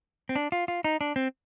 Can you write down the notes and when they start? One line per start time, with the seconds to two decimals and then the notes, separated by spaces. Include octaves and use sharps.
0.29 C4
0.36 D4
0.52 F4
0.68 F4
0.84 D#4
1.01 D4
1.16 C4